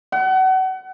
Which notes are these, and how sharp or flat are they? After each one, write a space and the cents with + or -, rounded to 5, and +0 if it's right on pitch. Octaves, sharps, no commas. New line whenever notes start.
F#5 +30